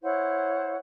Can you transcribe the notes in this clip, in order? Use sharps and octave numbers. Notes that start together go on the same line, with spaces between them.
E4 C5 C#5 F#5